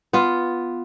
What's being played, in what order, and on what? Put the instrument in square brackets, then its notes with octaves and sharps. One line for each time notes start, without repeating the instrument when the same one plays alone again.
[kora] B3 F4